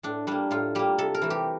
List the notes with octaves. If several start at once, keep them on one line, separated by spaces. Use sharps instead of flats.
A2 D4
G3 A#3 D4
A2 F4
G3 A#3 G4
C3 A4
A#4
E3 A3
G4